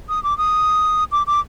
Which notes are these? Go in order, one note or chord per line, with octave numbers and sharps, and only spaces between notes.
D#6
D6
D#6
D6
D6